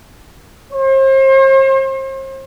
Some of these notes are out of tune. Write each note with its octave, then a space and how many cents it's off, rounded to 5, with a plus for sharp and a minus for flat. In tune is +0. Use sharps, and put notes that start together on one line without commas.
C5 +40